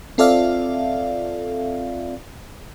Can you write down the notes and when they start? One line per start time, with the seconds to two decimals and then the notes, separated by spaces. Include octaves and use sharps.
0.18 C4 F4 A4 D5 E5 F5